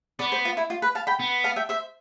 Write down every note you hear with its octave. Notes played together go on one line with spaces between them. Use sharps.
B3 D5
C5
F4
E4
F4
B4
F5 A5
G5 B5
B3
F5 A5
E5 G5
C5 E5